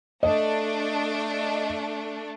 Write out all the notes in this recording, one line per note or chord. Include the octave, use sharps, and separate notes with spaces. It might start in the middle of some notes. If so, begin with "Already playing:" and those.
A3 D4 D#5